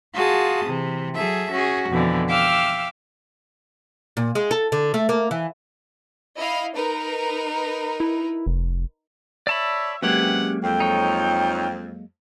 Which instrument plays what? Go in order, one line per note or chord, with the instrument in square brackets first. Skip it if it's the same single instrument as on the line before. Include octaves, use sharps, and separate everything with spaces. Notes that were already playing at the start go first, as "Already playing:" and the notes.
[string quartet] F4 F#4 G#4 A5 D#6
C3 E3
F#3 G#4 A4 E5
C#4 F#4 G#4
F2 B2 D3 E3
E5 F5 G5 D6 E6 F6
[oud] A#2
G#3
A4
D3
A3
A#3
E3
[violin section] E4 D#5 F5
D#4 A#4 B4
[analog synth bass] E4
F1
[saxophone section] C#5 E5 [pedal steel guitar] D5 A5 B5
[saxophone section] C3 B4 F#5 [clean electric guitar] F#3 G#3 A#3 [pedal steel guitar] C#4 G4
[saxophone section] F2 [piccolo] G5
[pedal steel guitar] D#4 C#5